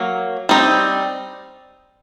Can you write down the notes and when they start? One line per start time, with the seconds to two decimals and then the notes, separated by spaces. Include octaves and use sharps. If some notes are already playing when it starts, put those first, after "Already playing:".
Already playing: F#3 A#3
0.49 G3 C4 D#4